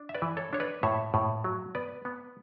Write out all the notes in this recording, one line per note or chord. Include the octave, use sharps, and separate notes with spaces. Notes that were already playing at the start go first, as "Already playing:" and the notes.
Already playing: D4
E5
B4 D5
E3
A4 C#5
D4 C#5
B4 D5
A2 C#5 E5
A2
F#3
B3 B4 D5
B3